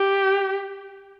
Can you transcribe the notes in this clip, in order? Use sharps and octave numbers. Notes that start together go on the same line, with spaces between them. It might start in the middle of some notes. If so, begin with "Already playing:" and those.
Already playing: G4